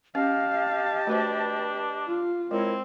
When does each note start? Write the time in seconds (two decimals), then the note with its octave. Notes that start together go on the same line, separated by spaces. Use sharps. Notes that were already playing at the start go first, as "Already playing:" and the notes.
0.15 C#4 G4 D#5 F5 A5
1.07 A3 D4 F#4 B4 C5
2.07 F4
2.51 G#3 C4 E4 A#4 C#5